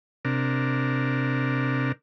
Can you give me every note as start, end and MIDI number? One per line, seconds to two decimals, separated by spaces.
0.25 1.92 48
0.25 1.92 62
0.25 1.92 70